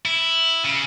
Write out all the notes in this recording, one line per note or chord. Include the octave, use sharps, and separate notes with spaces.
E4
C#3